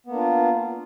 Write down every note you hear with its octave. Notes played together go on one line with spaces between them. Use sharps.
A#3 B3 D4 F4